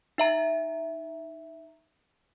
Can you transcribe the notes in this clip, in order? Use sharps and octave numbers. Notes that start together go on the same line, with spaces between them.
D#4 E5 A#5